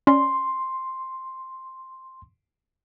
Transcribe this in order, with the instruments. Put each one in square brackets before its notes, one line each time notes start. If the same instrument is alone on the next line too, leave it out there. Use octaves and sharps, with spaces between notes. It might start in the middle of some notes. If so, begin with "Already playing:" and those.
[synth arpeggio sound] C#4 D5 [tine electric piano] C6